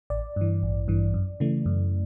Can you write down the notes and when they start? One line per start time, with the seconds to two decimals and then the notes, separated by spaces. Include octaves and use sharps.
0.10 A1 D5
0.36 G2 E3
0.63 A1
0.88 G2 E3
1.14 F#2
1.40 C#3 E3 A3
1.66 F#2